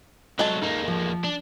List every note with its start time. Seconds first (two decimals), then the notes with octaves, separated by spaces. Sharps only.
0.39 C2 F#3 G#3 A4
0.62 E2 A#3 D#4
0.88 F3
1.24 D4